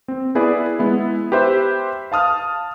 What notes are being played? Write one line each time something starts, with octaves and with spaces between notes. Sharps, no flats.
C4
B3 E4 G#4 B4 D5
G#3 B3 E4
G4 B4 C5 E5
F5 A5 D#6 F6